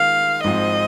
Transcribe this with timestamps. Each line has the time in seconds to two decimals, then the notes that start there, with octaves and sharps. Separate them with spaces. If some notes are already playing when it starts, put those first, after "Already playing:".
Already playing: D#3 G#3 F4 F5
0.44 G#1 G#2 F3 C4 D#5